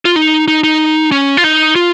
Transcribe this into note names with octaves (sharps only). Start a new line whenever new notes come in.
F4
D#4
D#4
D#4
C#4
F4
D#4
F4